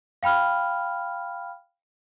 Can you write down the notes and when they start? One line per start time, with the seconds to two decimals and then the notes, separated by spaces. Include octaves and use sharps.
0.23 F5 G5 B5 F6